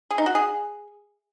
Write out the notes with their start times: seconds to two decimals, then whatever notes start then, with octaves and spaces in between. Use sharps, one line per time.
0.10 G#4
0.18 D#4
0.26 F#4
0.35 G#4